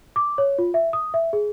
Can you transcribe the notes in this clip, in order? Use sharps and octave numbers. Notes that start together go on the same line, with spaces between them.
D6
C#5
F4
E5
D#6
E5
G#4